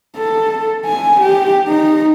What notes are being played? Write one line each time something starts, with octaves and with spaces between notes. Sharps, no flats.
A4
G#5
G4
D#4